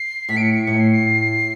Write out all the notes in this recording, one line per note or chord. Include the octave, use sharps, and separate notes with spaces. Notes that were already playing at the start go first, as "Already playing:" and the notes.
Already playing: C7
A2 B6
D7
C#7
C#7
A2 C#7
C7
C7